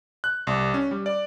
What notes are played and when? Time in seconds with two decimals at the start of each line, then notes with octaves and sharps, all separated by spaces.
0.24 F#6
0.47 C2
0.74 C#4
0.91 G3
1.06 D5